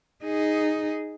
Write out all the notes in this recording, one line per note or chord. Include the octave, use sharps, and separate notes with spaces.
D#4 G#4